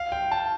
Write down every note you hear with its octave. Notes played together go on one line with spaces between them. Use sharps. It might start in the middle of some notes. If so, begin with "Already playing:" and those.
Already playing: F5
G5
A5